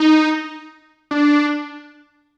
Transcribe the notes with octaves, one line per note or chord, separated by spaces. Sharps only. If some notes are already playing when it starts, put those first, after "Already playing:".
Already playing: D#4
D4